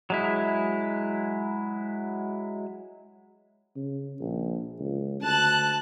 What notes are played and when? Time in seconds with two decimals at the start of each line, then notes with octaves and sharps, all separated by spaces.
0.10 F#3 G#3 E4
3.76 C#3
4.21 A#1
4.80 C#2
5.21 D2 A5 F#6